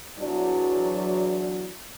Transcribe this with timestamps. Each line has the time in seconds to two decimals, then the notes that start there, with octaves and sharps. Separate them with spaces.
0.18 E2 F#3 D4